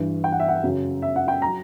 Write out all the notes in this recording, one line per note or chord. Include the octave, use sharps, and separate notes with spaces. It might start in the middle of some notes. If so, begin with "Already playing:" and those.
Already playing: G2 E3
G5
F#5
E5
F#5
F#2 C#3 F#3
E5
F#5
G5
F#3 A#5